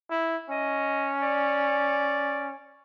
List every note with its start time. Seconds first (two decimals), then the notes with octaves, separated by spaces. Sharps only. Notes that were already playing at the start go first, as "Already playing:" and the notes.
0.11 E4
0.50 C#4 D#5
1.22 D5